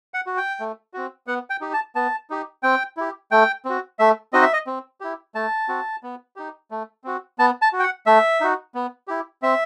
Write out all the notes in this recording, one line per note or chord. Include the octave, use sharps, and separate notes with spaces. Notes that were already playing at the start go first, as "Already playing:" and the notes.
F#5
F#4
G5
A3
C4 F#4
B3 F#5
G5
D#4 G4
A5
B3 A5
D#4 G4
C4 G5
E4 G4
A3 G5
C4 F#4
A3 E5
C4 D#4 F#4 D#5
E5
D#5
C4
E4 G4
A3 A5
C4 F#4
B3
D#4 G4
A3
C4 F#4
B3 A5
A5
F#4
G5
F#5
A3 E5
D#4 F#4
B3
E4 G4
C4 E5